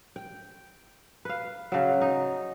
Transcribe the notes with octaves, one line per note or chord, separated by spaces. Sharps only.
G5
B4 F5
C#3 F#3
D#4